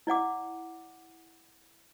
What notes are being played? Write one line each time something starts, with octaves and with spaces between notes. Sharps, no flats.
E4 D5 F#5 D6